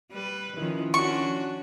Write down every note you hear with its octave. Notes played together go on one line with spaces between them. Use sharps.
G3 B4
D#3 F3 C#4 E4
C#4 D4 F#4 C#6